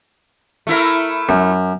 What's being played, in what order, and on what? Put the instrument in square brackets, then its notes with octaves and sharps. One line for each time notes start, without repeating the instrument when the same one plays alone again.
[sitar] A3 E4 A#4
[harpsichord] F#2